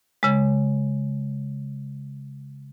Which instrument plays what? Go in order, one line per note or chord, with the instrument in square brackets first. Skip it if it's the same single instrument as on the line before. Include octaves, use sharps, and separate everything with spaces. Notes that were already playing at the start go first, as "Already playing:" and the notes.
[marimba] C#3 G#3